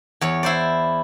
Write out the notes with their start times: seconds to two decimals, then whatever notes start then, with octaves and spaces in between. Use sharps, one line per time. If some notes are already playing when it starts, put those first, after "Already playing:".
0.21 E2 C#5
0.43 E4 C5 D5